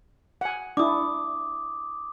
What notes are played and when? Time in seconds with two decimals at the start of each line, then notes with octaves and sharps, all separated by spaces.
0.41 F#5 G#5
0.77 D4 E4 D6 D#6